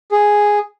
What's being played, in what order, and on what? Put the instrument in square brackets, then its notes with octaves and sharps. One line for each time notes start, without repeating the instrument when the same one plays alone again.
[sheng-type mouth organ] G#4